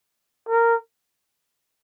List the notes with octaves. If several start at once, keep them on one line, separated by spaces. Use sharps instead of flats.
A#4